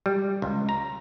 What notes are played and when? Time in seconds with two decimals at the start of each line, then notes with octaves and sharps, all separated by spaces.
0.06 G3
0.42 C#2
0.69 A#5